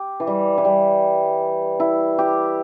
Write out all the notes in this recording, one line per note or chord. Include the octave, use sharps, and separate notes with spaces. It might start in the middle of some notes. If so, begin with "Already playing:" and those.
Already playing: G4
E3
G3
E3
G3
E4
G4